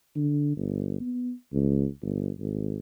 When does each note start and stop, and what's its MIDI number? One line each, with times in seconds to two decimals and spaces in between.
0.16 0.54 50
0.57 0.97 31
1.00 1.32 59
1.53 1.87 37
2.02 2.30 31
2.39 2.79 32